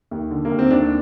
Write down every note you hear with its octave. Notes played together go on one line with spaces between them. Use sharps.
D#2
D3
A#3
D#2
C4
D#2 D4